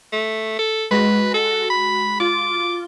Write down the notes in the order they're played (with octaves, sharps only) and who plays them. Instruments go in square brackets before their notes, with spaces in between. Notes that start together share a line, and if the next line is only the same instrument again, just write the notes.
[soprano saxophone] A3
A4
[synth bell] G#3 F#4 [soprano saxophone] B4
[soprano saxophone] A4
B5
[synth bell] F4 [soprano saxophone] D6